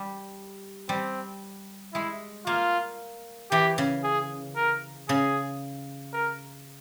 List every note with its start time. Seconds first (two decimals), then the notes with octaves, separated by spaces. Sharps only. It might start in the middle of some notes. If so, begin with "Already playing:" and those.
Already playing: G3
0.89 G3 C4
1.94 G#3 E4
2.47 A#3 F4
3.52 E3 G4
3.78 C#3
4.04 G#4
4.56 A#4
5.09 C#3 G#4
6.13 A#4